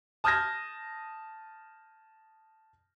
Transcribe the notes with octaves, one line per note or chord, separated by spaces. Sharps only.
A5 D#6 F6 G6 G#6 A#6